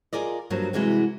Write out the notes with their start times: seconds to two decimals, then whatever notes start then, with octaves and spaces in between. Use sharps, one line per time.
0.13 F4 G4 G#4 A#4 D5 D#5
0.50 G2 F3 F#3 A#3
0.73 C3 E3 G3 G#3 F#4